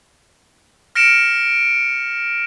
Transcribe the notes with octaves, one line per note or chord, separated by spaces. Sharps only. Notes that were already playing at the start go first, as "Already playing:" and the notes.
F6 A#6 C#7 D7 E7